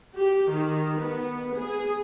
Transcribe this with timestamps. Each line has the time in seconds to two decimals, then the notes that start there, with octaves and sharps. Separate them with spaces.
0.15 G4
0.50 D#3
0.98 B3
1.54 G#4